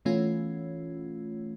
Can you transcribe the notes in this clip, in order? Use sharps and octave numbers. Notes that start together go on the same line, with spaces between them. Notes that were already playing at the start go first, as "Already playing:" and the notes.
B2 E3 A3 C#4 F4